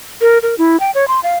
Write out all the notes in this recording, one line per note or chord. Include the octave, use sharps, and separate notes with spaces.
A#4
A#4
E4
G5
C#5
C6
F5